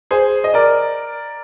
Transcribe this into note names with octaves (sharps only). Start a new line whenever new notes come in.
G#4 C5
D#5
A#4 D5